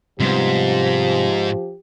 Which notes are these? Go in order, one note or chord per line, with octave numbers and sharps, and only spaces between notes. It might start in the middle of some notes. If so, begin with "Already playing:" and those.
G#2 C3 F3 G3 B3 G4